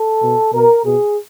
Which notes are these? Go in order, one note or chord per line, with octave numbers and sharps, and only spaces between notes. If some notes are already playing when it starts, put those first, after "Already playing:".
Already playing: A4
B2
B2 A#4
B2 G#4